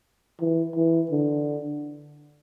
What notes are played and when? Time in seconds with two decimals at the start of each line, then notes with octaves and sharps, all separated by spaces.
0.40 E3
0.76 E3
1.11 D3